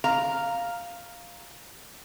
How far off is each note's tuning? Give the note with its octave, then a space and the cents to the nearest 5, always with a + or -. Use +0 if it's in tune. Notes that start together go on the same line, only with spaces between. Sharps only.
F5 +0 A#5 +0